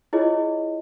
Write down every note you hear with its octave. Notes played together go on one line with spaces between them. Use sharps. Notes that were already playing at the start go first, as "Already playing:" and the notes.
E4 F4 G#4 C#5 D#5